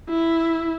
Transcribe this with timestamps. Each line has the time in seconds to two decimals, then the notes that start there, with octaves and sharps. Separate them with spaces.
0.10 E4